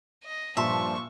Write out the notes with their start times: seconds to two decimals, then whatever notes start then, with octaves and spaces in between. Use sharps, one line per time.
0.23 D#5
0.57 G2 A#2 F3 G3 E5 A5 C6 C#6